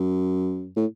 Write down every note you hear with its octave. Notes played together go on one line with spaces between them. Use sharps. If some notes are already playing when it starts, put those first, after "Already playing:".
Already playing: F#2
A2